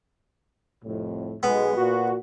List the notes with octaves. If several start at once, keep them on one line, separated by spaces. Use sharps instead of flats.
C2 F2 A2
B1 G#3 B3
A#2 F#4